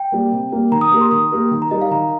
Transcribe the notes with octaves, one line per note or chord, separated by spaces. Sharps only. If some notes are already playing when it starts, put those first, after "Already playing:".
Already playing: G5
G3 A#3
C3
G3 A#3
D#3 A#5
D#6
A#3 G4 A#4 D#6
C6
D#3 D#6
A#3 G4 A#4
D#3
A#5
G3 D#4 A#4 D#5
F5
D#3 A#5